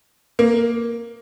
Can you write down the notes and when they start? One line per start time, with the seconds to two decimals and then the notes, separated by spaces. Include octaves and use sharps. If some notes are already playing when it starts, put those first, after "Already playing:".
0.39 A#3